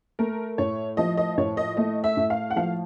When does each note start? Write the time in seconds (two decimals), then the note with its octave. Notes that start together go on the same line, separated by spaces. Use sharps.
0.19 A3 A#4
0.58 A2 C#5
0.97 F3 D#5
1.17 D#5
1.38 A2 C#5
1.57 D#5
1.77 A3 D#5
2.04 E5
2.17 A2
2.30 F5
2.50 F#5
2.56 F3 F5